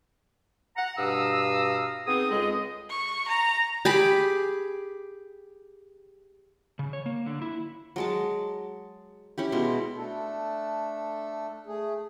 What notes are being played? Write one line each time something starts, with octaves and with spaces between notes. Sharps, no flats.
F#5 A#5
G2 B2 F5 A#5 D#6 E6
B3 C4 D#4 G#4 D#6
C#2 G#3 G#4 A4 D#5
C#6
A#5
G4 G#4 B5
C#3
C#5
A#3
D3
E4
F#3 G#3 A5
C#4 E4 G4
B2 G#3 C6
A3 D4 A4
A3 G#4